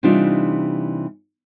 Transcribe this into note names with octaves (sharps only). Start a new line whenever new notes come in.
C3 E3 G3 D4 D#4 F4